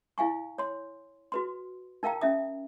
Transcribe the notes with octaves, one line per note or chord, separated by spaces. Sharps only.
E4 F5 G#5 C#6
C#5 C6
F#4 B4 C6
D#4 A#4 F5 G5 A#5
C#4 D#4 E5 D#6